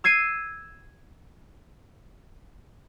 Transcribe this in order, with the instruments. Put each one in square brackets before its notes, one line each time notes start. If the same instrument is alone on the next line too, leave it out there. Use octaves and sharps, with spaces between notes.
[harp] E6 G#6 C7 D#7